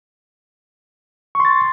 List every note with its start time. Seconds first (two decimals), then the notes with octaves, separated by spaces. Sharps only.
1.35 C#6
1.40 C6
1.45 A6